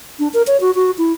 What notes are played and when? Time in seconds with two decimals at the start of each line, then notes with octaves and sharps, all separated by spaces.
0.19 D4
0.34 A#4
0.47 C#5
0.61 F#4
0.75 F#4
0.98 E4